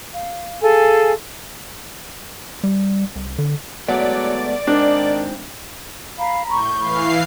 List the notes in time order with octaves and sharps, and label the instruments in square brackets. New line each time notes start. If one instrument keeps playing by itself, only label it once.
[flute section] F5
G#4 A4 F5 G#5
[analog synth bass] G3
C2
D3
[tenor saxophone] F#3 [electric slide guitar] G#3 A3 B3 [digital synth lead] D5
[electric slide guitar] G#2 C4 [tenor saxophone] D#3 [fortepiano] D4
[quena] F5 [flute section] A#5 B5
[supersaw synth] A2 G6 [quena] C#6
[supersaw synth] E3 F5 C7 [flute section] B5